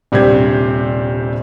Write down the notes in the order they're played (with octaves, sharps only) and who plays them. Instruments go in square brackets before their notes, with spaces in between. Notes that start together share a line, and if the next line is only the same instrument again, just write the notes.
[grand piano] D#1 C3 G3 D4 C5 G#6